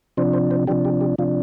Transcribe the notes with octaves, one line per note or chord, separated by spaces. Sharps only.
C3 F3 D4 C5
C5
C5
C3 F3 D4 G4
G4
G4
C3 F3 D4 F4